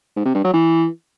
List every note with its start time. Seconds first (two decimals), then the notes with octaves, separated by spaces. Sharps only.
0.16 G#2
0.26 C3
0.35 G2
0.44 F#3
0.54 E3